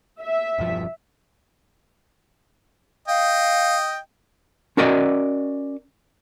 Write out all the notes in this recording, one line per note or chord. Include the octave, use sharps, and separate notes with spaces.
E5
E1 G2 F3
D#5 F5 G5
C#4 F#4 A#4 D5 D#5 F#5